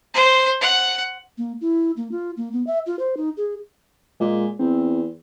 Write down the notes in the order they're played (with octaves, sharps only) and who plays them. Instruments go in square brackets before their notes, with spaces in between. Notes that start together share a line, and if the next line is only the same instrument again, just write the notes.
[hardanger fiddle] C5
F#5
[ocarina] A#3
E4
A#3
F4
A#3
B3
E5
F4
C5
D#4
G#4
[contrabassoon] A#2 [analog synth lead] G#3
[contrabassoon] E2 [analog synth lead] C4